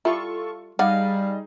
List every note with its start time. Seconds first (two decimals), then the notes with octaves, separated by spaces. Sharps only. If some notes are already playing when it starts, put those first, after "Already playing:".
0.05 G3 E4 F4 A4 C#6
0.79 G3 D#4 G#4 D5 D#5 F5 F#5